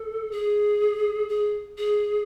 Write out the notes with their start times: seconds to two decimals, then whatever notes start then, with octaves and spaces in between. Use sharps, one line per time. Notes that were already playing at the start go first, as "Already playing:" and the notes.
Already playing: A4
0.32 G#4
1.29 G#4
1.78 G#4